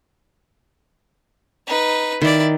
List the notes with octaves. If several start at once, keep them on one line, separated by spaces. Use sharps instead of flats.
D#4 B4
D#3 E4 D5